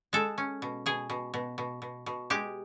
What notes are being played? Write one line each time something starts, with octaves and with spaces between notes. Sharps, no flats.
G#3 A4
C#4
B2
B2 G#4
B2
B2
B2
B2
B2
G#3 G4